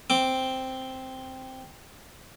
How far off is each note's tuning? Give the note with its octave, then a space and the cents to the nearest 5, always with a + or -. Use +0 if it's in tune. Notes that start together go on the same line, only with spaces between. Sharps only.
C4 +0 D6 +0